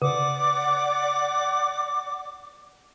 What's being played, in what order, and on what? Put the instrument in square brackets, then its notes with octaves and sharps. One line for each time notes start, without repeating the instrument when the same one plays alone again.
[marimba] C#3 [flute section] D5 F#5 D6